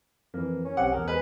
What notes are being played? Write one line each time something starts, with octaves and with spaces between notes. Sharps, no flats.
F2 E3 A#3
C#4
B1 C4 G4 F#5
E2 G#4 A#4
G#3 B4